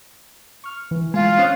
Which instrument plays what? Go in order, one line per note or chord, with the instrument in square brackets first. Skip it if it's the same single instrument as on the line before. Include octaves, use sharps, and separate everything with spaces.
[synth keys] C#6 F6
E3
[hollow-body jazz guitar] G#3 [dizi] F4
[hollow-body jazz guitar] C#4 C5 C#5 [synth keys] D#6 F#6